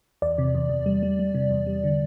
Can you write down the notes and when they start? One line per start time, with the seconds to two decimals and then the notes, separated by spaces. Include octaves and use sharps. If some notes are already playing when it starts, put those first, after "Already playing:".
0.22 E2 D5
0.38 C3
0.55 E2
0.70 E2
0.86 G3
1.03 G3
1.19 G3
1.35 C3
1.51 E2
1.67 G3
1.84 D3